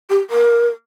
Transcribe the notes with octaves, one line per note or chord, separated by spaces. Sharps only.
G4
A#4